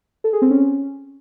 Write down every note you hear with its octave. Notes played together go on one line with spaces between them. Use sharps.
A4
G#4
C4
C#4